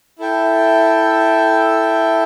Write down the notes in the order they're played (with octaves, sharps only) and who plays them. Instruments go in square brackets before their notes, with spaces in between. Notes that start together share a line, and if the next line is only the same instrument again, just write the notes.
[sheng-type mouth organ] E4 A4 E5 G5